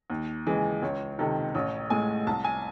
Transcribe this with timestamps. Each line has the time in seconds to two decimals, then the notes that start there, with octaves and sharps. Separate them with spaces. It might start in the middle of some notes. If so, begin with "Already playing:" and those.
0.10 D#2
0.47 C#3 E3 G#3
0.82 C#2 C#5
1.19 C3 D#3 A4
1.55 A1 C#5
1.90 A2 G#3 G#5
2.27 C2 A5
2.45 G#5